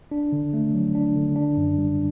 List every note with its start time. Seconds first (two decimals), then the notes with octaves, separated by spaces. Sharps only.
0.11 D4
0.32 D3
0.54 A3
0.74 F#3
0.95 D4
1.15 D3
1.36 D4
1.57 F#2
1.78 G3